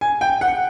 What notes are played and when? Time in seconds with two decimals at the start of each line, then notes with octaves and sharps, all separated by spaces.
0.01 G#5
0.21 G5
0.41 F#5